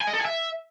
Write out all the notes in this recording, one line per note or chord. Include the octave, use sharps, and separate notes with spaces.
G#5
D#5
A4
G#5
E5